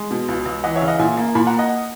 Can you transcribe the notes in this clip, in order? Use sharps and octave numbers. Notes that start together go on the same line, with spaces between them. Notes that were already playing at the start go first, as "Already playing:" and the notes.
Already playing: G#3
B2
C#2
C#2
E3 D#5 F#5
C#5 E5
C#3
D#5 F#5
A#2 E5 G#5
A#3
A#2 G#5 B5
F#5 A#5
A#3
D#5 F#5